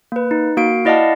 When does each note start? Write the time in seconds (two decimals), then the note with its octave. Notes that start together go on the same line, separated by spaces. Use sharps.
0.12 A#3 B4
0.31 D#4
0.57 A#3 F#4 F5 D7
0.85 E4 D5 D#5 F5 F#5 A5